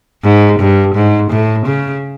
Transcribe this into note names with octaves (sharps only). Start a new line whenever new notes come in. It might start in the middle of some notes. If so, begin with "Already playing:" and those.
G#2
G2
G#2
A2
C#3